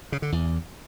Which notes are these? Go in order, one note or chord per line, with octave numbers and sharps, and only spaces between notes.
C#3
D3
E2